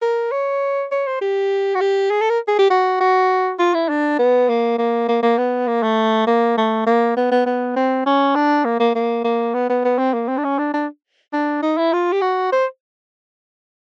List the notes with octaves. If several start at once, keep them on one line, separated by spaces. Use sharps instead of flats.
A#4
C#5
C#5
C5
G4
F#4
G4
G#4
A4
A#4
G#4
G4
F#4
F#4
F4
E4
D4
B3
A#3
A#3
A#3
A#3
B3
A#3
A3
A#3
A3
A#3
B3
B3
B3
C4
C#4
D4
A#3
A#3
A#3
A#3
B3
B3
B3
C4
A#3
C4
D4
C#4
D4
D4
D4
D#4
E4
F4
G4
F#4
C5